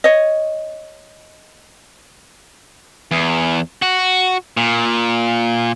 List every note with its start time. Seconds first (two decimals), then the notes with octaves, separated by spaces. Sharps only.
0.04 C#5 D#5
3.11 E2
3.82 F#4
4.57 A#2